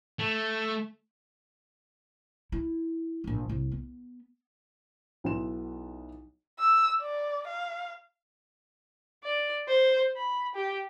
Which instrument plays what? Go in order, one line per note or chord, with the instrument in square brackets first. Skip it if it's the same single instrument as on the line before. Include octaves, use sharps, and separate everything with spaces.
[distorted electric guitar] A3
[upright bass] E4
D#1 A#1
C2
B3
[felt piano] B1 B3 E4 C6 E7
[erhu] E6
D5
F5
[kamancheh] D5
C5
B5
G4